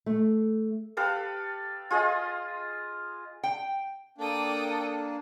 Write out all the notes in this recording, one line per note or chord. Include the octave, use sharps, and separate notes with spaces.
A3
G4 A4 B4 F5
F4 G#4 D#5
G5
A#3 D4 A4 D5 G5 D#6